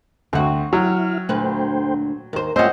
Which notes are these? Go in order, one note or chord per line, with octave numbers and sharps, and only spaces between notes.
D2 C4 F#4
F#3 E4 F6
D2 A#2 A3 B4 C5 G5
D#2 A#4 C5
A3 C4 C#4 F4 C5 D#5 E5 F#5